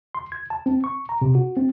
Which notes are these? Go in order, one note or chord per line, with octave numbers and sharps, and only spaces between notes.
C6
G#6
A5
C4
C#6
A#5
C3
F#4
C4